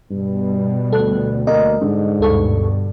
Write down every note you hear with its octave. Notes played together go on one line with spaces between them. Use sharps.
G2 B2 G3
D2 A4 F#6
A#3 D#5
G#2 D3
D2 G2 B2 A4 C#6